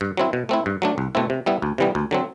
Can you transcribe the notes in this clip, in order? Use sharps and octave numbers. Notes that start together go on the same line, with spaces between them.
G2
F#3 C4 E4
B2
A3 C4 E4
G2
F#3 A3 D4
C2
B2 A3 C4 E4
C3
G3 B3 E4
D2
C3 E3 G3 B3
D2
D3 F#3 C4